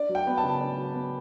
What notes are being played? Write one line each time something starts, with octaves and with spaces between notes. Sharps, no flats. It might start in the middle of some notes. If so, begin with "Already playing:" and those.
Already playing: D4 D5
F#3
G5
B3
A5
C#3
D4
F#3
B3